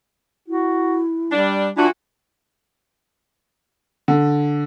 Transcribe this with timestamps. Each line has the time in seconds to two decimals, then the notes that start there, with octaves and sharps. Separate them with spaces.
0.48 E4 F#4
1.30 G3 D4
1.77 E3 D4 F4 F#4
4.08 D3